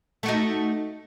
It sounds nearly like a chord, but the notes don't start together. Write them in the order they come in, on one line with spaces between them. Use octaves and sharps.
A3 F#4 D#4